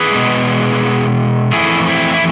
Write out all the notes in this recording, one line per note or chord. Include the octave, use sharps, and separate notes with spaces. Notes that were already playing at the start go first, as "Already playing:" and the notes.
Already playing: G#4 B4
B2 G#3
F2 E3 A3 E4 G#4
C4 E4
E4